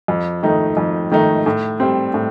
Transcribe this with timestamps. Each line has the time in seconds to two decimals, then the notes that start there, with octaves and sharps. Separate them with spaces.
0.08 F2
0.43 D#3 A3 D#4
0.77 F2
1.11 D#3 A3 D#4
1.46 A2
1.80 G3 C4
2.14 A2